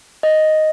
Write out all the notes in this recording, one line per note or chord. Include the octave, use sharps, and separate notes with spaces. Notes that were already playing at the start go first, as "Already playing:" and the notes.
D#5